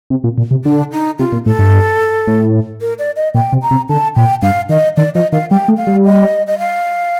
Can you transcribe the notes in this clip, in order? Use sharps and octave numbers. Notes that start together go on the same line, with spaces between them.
C3
A#2
A#2
C3
D3 D4
D#4
C3 F4
A#2
A2 A4
G2
A2
A#4
D5
D#5
A#2 G5
C3
A#5
C3
D3 A5
A#2 G5
G2 F5
D#3 D#5
D#3 D5
F3 D#5
D#3 F5
G3 G5
A3
F5
G3
D#5
D#5
F5